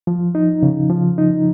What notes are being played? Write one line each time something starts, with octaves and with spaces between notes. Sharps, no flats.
F3
D#4
C#3
F3
D#4